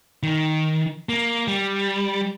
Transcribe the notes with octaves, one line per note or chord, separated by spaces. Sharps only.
D#3
A#3
G3